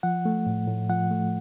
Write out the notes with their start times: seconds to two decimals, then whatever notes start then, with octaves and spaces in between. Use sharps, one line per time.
0.03 F3 F#5
0.25 A3
0.47 A2
0.68 A2
0.90 F3 F#5
1.11 A3